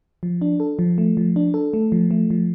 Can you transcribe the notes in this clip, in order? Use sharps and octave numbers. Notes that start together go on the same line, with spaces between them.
F3
D4
A4
F3
A3
F3
D4
A4
A3
F3
A3
F3